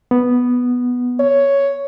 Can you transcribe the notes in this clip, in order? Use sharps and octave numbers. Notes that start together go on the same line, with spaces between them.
B3
C#5